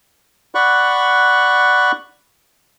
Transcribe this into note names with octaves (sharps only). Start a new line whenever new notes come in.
D5 F#5 B5 C#6 F#6